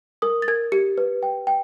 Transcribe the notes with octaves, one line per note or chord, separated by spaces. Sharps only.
A#4 D#6
A6
A#4 G#6
G4 C#7
B4
G5
G5